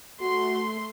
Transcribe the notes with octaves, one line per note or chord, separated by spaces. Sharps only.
A3 F#4 C6